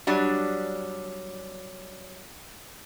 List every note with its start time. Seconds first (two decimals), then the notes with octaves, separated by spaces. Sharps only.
0.07 F#3 G3 D4